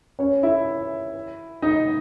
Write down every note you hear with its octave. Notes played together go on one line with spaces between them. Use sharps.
C#4 C#5
E4 E5
D#4 D#5